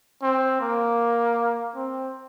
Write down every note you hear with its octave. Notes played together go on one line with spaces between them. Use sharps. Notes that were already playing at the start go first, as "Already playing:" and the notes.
C4
A#3
C4